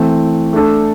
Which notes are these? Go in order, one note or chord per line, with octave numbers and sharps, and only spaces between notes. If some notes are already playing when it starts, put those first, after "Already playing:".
Already playing: E3 A3 C4
A3 D4 A4